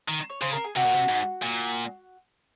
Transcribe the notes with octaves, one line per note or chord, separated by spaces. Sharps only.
D#3
C#5
C#3 C5
A#4
G#4
C3 F#4
A#2
C3
G#2
A#2